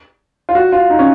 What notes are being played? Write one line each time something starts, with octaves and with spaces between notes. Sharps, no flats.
F4
F#4
F4
D#4
C#4